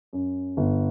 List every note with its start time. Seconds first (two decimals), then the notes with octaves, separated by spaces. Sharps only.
0.13 F#2
0.57 G1